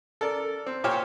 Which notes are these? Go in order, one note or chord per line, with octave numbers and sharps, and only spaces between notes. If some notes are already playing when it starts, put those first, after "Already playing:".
A4 A#4 D5
C4
A#2 G4 C5 C#5 G5 F6